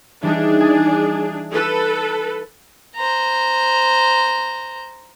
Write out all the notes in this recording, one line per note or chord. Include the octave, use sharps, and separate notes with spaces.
E3 G3 D4 D#4 G#4
G#5 D#6 A6
A4 B4
C5 A#5